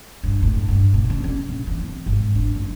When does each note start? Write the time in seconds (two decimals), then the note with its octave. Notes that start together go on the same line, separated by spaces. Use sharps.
0.24 G2
0.42 A2
0.68 G2
0.94 A#2
1.10 C#3
1.24 C#4
1.49 A#1
1.67 E3
1.85 C4
2.06 G#1
2.35 D4
2.55 F#1